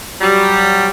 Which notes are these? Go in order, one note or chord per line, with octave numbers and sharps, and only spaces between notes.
F#3 G3